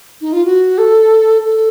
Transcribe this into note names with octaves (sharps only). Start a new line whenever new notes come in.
D#4
F4
F#4
A4
A4